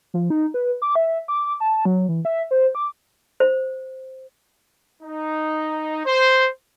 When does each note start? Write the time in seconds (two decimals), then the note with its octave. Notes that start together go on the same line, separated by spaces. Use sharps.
0.14 F3
0.30 D#4
0.54 B4
0.82 D6
0.95 E5
1.28 D6
1.60 A5
1.85 F#3
2.09 E3
2.25 E5
2.51 C5
2.75 D6
3.40 C5
5.02 D#4
6.06 C5